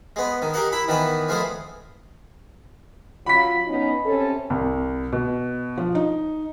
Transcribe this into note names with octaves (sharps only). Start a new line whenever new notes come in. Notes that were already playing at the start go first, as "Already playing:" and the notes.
G#3 B3
D#3
G4 G#4 A#4 F#5
E4 E5 B5
D#3 E3 B3 B4
F3 G#3 A3 B3 G#4
F#3 F4 B5 B6
B3 C#4 D#4
C3 C#4 A4
C2
B2
F3
D#4